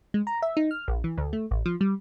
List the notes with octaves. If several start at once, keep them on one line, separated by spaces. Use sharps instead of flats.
G#3
A#5
E5
D#4
F6
A#1
E3
D2
A3
A1
F3
G3